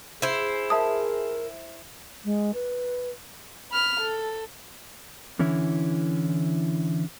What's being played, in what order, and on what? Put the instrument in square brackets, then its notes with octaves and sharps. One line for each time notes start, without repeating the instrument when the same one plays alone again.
[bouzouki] E4 C5 [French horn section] G#4
[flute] A#4 [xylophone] E5 A5 D#6
[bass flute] G#3
B4
[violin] B5 F6
A4
[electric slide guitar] D3 E3 C#4 E4